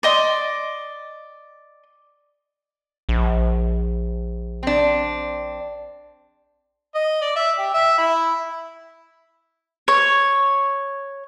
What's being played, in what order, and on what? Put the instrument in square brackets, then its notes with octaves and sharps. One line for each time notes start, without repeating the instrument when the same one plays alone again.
[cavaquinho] D5 D#5 C6
[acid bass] A#1
[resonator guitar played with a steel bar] C4 D4
[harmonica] D#5
D5
E5
G4
E5
E4
[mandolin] C#5